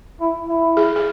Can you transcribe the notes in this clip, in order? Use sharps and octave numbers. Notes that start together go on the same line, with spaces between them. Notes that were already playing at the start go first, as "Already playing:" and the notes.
E4
E4
G#4
G#4